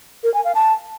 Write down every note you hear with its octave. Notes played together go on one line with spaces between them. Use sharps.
A#4
G#5
F5
A5